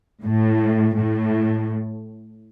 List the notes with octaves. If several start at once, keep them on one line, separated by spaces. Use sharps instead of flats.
A2
A2